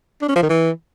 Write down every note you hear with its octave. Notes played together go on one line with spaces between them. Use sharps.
D4
C#4
F3
D#3
E3